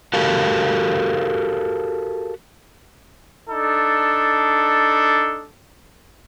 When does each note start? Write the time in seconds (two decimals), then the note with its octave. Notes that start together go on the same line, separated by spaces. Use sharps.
0.14 F#4 G4 A4 A#4 F5
3.50 D4 D#4 A4